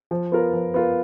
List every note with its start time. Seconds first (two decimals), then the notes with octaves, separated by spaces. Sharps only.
0.11 F3
0.32 B3 F4 A#4
0.53 F3
0.74 B3 F4 A#4